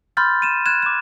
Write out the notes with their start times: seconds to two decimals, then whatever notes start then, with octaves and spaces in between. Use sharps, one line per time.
0.17 B5 C6 F6 G6 A6
0.42 D#7 E7
0.66 F#6 G#6 E7
0.82 D6 E7